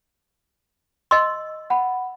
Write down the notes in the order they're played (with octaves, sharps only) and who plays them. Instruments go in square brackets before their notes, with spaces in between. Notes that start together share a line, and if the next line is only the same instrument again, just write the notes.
[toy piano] D#5 C6 [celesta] E6
[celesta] F#5 B5